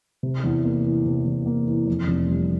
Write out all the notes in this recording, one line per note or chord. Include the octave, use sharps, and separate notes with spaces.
C3
E2
A#3
E3
C3
E2
A#3
E3
F2
F1
G3